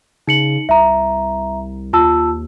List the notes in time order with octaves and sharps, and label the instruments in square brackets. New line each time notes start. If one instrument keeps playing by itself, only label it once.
[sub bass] C#3 [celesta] D#4 C#7 F#7
[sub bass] C2 [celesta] E5 A#5
[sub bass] D#2 [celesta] F4 A5 E6